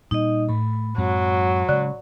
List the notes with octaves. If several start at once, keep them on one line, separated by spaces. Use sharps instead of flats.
A#2 G3 D#4 D#5
A2 A3 B5
F#2 F#3 G#3 C4
C#3 G#3 C#4 D5 F#6